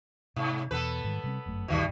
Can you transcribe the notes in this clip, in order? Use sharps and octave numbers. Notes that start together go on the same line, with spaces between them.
G#2 C3
E2 B2 B3 A4 B4
G#2 D#3 G3
C3 G3 C4
G1 F#2 A3
D#1 D2 G2 B2 D#3 G3